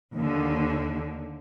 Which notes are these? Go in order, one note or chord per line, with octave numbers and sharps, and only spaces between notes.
D#2 D3